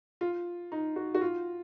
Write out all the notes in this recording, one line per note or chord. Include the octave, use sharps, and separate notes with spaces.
F4
D#4
F#4
F#4
F4